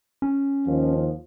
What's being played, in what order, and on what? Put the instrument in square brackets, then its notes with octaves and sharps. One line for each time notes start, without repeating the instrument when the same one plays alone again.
[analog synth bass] C#4
[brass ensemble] D#2 F3